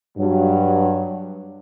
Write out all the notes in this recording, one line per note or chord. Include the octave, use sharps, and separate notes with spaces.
G2 F#3